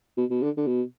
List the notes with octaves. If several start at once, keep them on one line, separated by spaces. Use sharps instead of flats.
B2
B2
D3
D3
B2